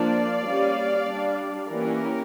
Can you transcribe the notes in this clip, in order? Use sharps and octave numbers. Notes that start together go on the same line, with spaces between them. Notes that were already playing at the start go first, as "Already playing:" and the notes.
Already playing: F3 A#3 D4 D5 F5
G3 A#3 C#4
G3 D4
E3 A#3 C#4 G4 A#4